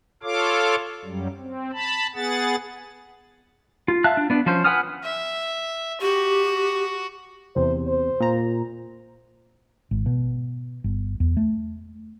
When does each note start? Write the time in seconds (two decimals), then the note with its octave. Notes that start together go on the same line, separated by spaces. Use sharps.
0.23 F4 A4 C#5 F5 D6
1.05 F#2 F#3 G3
1.37 C4
1.73 A5 B5
2.15 B3 G#4 F#5 A6
3.88 F4
4.04 E5 F5 A5 F#6
4.17 D4
4.30 B3 D4
4.46 F3 C#4 C5
4.64 B4 F#5 G#5 D#6 F6
5.04 E5
6.01 F#4 G4
7.56 E2 C3 C5
7.88 C5
8.20 A#2 A#5
9.91 G#1
10.06 B2
10.84 G1
11.20 E2
11.37 A3